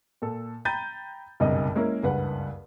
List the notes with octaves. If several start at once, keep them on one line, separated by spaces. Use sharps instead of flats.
A#2 A4
G5 A#5 B5 G6 A6 D#7
F#1 B1 G2 C3 D#4 D#5
G#3 A#3 C#4 E4 A#4
F#1 C#2 G2 B4 F#5